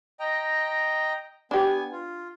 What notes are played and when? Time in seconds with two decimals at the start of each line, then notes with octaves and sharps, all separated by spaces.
0.20 D#5 G5 A#5
1.51 B3 D4 G4 G#5
1.92 F4